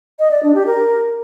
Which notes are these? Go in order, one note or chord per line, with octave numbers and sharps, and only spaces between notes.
D#5
D5
D4
G4
A#4